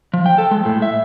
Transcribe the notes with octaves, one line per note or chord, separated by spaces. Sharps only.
F3
G5
A4
G#3
A2
E5